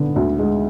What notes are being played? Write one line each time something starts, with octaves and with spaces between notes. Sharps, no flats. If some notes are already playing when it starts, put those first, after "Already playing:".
Already playing: D3 B3
D2
G#3